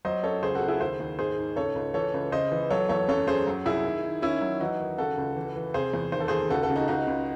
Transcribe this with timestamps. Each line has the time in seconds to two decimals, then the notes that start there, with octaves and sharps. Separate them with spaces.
0.05 F#3 C5 D#5
0.23 F#2 A4 C#5
0.43 C#2 G#4 C5
0.55 F#4 A4
0.62 C#2
0.68 E4 G#4
0.80 D#2 G#4 C5
1.00 D#2
1.19 G#2 G#4 C5
1.38 G#2
1.56 C#2 A4 C#5
1.75 C#2
1.94 E3 A4 C#5
2.14 C#2
2.32 C#3 C5 D#5
2.52 E3
2.70 F#3 A4 C#5
2.89 E2 A4 C#5
3.08 F#2 A4 C#5
3.27 F#2 G#4 C5
3.47 F#3
3.66 C2 E4 G#4
3.85 D#3
4.04 D#3
4.22 D#3 C#4 E4
4.41 F#3
4.60 E3 D#4 F#4
4.80 D#2
4.98 C#3 F#4 A4
5.18 C#2
5.36 E3
5.56 E3
5.74 C3 G#4 C5
5.94 E2
6.12 D#2 C5
6.20 A4
6.28 D#2 G#4 C5
6.50 C#2 F#4 A4
6.63 F#4 A4
6.69 C#3
6.76 D#4 F#4
6.88 C#2 D#4 F#4
7.08 C#2